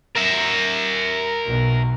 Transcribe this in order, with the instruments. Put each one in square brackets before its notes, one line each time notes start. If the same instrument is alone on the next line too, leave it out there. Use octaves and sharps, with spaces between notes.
[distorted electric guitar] A#4 E5
[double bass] B1 B2